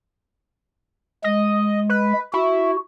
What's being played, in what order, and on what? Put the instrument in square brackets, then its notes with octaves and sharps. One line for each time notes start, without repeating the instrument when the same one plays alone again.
[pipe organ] G#3 [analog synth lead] D#5
[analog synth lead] B4
[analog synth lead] E4 [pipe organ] F#4